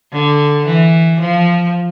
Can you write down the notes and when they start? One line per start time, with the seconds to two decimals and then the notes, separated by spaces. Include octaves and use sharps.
0.12 D3
0.66 E3
1.20 F3